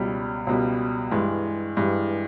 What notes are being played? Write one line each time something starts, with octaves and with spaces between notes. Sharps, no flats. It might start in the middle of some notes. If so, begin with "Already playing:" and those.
Already playing: C#2 B2 G3
C#2 B2 G3
G2 E3 G#3
G2 E3 G#3